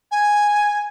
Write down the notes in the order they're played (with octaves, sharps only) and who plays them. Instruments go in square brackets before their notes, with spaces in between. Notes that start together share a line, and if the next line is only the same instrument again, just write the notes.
[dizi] G#5